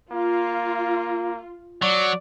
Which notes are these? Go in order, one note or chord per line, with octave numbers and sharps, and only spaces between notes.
A#3 F4
F#3 D5